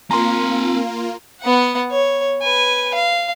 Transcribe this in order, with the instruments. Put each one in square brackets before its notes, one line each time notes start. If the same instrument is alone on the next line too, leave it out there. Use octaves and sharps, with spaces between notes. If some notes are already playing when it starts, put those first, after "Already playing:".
[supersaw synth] A#3 F4 [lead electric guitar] C4 G#5 [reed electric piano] A#5 C6
[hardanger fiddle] B3 F#5
C#5
B4 G#5
F5